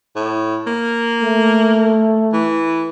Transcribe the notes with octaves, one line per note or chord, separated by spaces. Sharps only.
A2
A#3
A3
E3